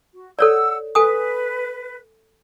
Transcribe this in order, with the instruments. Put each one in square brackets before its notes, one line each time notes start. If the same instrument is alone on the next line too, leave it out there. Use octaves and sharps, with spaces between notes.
[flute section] F#4
[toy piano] A4 C#5 D5 [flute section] F#5 E6
[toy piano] A4 G#5 D#6 [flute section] B4